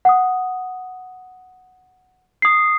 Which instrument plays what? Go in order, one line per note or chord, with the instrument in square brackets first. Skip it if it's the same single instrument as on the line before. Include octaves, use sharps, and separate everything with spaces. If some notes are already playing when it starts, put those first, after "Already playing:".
[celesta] F#5 D#6
[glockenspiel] D#6 C7